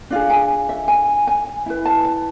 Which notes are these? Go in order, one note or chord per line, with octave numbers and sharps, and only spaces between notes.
D4 F4 G#4
G#5
E5
G#5
G#5
E4 B4
A5
A5